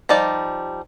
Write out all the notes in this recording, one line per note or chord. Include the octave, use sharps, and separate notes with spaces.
F3 G3 D#4 D5